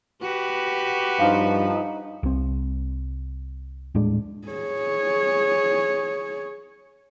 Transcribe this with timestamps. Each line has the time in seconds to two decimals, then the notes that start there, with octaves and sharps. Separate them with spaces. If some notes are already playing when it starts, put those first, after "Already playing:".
0.22 F#4 G4 B4
1.19 G2 F3 D#4
2.23 C2 C4
3.95 D#1 A2 G#3 D4
4.48 G#4 C#5